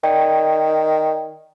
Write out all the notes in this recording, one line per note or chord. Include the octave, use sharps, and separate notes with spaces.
D#3 D5 G5